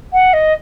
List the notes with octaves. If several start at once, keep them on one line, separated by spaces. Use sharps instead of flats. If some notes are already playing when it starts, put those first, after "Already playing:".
F#5
D#5